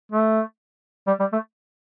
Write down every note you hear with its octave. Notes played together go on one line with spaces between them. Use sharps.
A3
G3
G3
A3